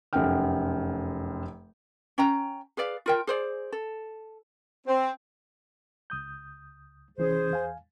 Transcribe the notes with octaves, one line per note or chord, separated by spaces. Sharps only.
F1 F#2 A4 F#5 G5 F6
C#4 G5 A#5
G#4 B4 D5 F5
F4 A#4 G5
G#4 C5 D5
A4
C4
C#2 D#6 G6
C2 E3 C#4 G#4 C5
E2 F5 G#5